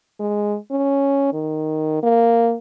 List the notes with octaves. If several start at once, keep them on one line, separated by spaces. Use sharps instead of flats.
G#3
C#4
D#3
A#3